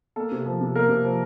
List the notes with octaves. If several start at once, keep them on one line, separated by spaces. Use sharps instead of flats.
A#3 A4
C3
F3
C3
A#3 A#4
C3
F3